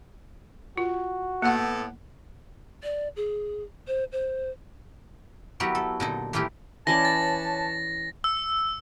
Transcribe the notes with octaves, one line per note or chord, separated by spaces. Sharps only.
F4 F#4
A2 A#3 B3 A4 F#5
D5
G#4
C5
C5
F#3 B3 E4 F#4 G4 A#4
A4
A#2 D3 D#4
A2 E3 A#3 E4 F4 G4
E3 C#4 B4 C#5 D5 A5 A#6
A6
E6